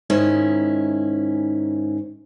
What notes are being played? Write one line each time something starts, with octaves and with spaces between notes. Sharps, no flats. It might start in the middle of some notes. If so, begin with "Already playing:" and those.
G#2 D#3 C#4 E4